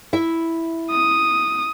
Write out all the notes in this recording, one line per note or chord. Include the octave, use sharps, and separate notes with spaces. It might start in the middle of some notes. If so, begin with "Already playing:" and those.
E4 E5
D#6